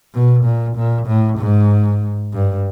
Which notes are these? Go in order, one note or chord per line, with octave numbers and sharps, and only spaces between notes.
B2
A#2
A#2
A2
G#2
G2